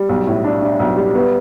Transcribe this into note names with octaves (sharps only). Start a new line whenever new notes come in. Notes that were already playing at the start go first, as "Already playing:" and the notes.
Already playing: G3
B1
A2
D4
D4
B1
G3
B3